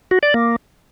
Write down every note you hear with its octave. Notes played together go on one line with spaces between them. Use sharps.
F#4
D5
A#3